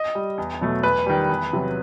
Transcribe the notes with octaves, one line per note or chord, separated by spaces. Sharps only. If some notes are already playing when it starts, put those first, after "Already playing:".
Already playing: D#5
G3
E2
B2 F#3 A3
E2 B4
D#3 G3
E2
C3 F#3